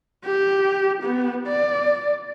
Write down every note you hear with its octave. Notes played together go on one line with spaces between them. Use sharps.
G4
B3
D5